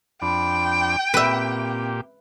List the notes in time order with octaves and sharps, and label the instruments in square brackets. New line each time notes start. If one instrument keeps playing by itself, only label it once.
[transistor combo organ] F2 D4 [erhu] G5 [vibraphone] B5
[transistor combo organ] A#2 G4 [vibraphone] C4 [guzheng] B4 E5